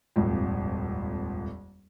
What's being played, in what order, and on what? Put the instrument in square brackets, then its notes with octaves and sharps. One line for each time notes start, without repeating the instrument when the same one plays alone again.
[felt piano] D#1 G#1 F2